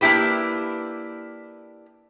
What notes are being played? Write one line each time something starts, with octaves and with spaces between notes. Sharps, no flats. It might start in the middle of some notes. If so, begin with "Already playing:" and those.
A#3 D4 E4 G4 B4